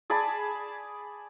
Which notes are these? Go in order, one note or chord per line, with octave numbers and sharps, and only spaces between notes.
G#4 D5 A5 B5